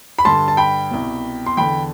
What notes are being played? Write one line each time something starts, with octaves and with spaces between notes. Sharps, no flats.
B5
G2 D3 A5 C6
A5
G5 B5
C2 B2
C6
E2 D3 G5 B5